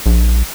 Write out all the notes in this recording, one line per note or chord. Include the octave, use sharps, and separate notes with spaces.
A#1